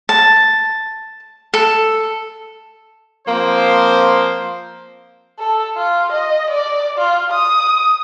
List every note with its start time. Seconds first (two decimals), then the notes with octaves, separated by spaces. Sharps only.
0.09 A5
1.54 A4
3.27 F3 A#3 C4 C5
5.39 A4
5.76 F4
6.12 D#5
6.50 D5
6.98 F4
7.32 D#6